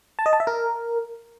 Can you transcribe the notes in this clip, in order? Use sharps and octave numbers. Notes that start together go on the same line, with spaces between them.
A5
D#5
A5
E5
A#4